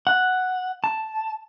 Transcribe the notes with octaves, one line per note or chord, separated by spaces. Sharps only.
F#5
A5